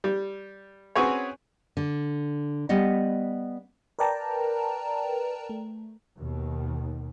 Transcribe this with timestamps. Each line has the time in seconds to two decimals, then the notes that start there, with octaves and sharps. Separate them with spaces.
0.04 G3
0.95 C4 C#4 F#4 G#4 B4 C#5
1.77 D3
2.69 G3 B3 D#5 F#5
3.99 A#4 B4 D5 G5 A5 A#5
5.49 A3
6.18 D#2 B2 D#3